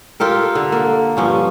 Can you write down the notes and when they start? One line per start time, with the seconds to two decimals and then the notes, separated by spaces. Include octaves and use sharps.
0.20 F4 G4 A4 A#4
0.55 D3
0.72 A#3
1.17 G2 F3 C#4